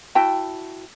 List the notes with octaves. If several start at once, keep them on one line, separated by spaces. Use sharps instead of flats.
E4 F#4 G5 A5